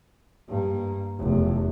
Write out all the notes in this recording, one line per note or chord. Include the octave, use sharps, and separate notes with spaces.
G2 A#3
F1 E2